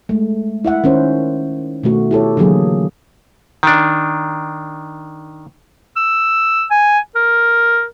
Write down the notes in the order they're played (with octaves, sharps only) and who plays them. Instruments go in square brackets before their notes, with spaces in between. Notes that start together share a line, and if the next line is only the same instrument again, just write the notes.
[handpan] G#3 A3
E4 E5 F#5
D#3 C#4 C5
B2 D#3 A3 F#4
E4 G4 A4 C#5
D3 E3 F#3 A#3 G#4
[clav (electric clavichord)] D#3 D4
[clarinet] E6
G#5
A#4